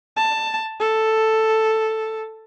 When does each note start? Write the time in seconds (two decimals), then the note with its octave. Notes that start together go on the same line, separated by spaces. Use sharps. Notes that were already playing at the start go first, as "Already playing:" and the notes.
0.17 A5
0.80 A4